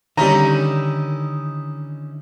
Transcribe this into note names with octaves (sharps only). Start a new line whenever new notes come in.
D3 D#3 G3 C#4 D#4 E4 A#5